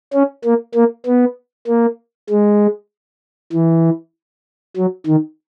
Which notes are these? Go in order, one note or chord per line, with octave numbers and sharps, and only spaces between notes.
C#4
A#3
A#3
B3
A#3
G#3
E3
F#3
D#3